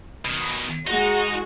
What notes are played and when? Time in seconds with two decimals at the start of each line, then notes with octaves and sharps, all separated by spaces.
0.25 B2 D#3
0.87 G#3 D#4 F#4